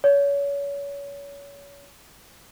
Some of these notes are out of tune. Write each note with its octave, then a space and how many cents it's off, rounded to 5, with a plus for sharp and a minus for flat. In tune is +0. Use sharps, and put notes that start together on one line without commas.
C#5 +30